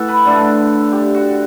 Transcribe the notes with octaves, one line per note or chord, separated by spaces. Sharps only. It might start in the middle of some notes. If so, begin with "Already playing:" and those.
Already playing: A2 E3 A4 E5 F#5
B4
D3 A3 D4
G4
F#4